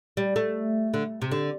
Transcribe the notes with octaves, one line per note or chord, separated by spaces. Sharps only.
G3
A3
D3
C3
D3